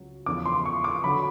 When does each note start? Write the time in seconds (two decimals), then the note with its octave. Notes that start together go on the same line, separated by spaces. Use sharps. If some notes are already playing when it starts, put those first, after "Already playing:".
Already playing: C#2 C#3 F#3
0.26 E2 C#3 F3 D6
0.46 C6
0.65 C#6
0.84 D6
1.04 D3 F#3 B5